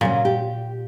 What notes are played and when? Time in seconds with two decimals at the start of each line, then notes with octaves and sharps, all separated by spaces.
0.01 A#2 C#3 F#3 C#4
0.25 G4